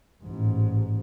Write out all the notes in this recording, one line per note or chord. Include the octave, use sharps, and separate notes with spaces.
A1 G#2